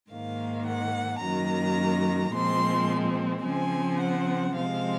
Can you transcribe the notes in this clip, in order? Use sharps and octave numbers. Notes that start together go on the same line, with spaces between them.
G#2 D#3 A#3 F5
F#5
F#2 D#3 F#3 A#3 A#5
A#2 F3 G#3 C4 C6
C#3 F3 C4 G#5
F#5
C3 F3 G#3 C4 F5